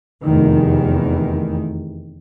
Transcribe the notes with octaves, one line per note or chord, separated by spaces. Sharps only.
F1 E2 D#3